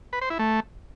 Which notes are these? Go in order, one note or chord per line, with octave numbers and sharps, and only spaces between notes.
B4
C5
E4
A3